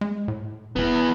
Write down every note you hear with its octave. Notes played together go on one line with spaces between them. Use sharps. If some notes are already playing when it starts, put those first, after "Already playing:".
G#3
A2
F1 E3 B3